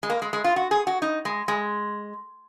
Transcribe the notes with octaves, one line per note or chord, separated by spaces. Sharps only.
G#3
A#3
G#3
G#3
F4
F#4
G#4
F#4
D#4
G#3
G#3